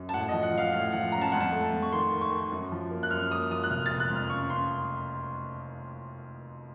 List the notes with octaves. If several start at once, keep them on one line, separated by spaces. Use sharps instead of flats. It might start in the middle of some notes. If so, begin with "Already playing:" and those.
Already playing: F#2
A5
A2 F#5
D#5
F3
F#5
F3 F5
A2 F5
F3 F#5
C#4 A#5
A5
F2 F#5
A5
A3
F2
C#6
D#3 C6
D#3
C#6
D#3
F#2
F3
A#3
F#6
F#2 F6
A#3 D#6
F3 D#6
F#6
F1 F6
A6
F1
F#6
F2
F6
C#3 C#6
C#3 C6